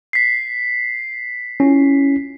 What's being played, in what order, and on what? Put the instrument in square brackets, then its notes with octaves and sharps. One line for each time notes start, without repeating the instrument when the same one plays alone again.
[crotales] B6 C7
[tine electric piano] C#4 E4 F4